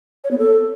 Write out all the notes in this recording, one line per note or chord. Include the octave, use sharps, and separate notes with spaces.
C#5
B3
A4